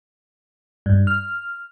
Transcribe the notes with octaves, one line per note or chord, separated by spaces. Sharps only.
G2
F6